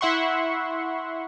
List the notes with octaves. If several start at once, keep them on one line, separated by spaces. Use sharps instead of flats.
E4 E5 F#5 C6 C#6